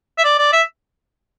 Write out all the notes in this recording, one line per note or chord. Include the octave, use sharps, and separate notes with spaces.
E5
D5
D5
E5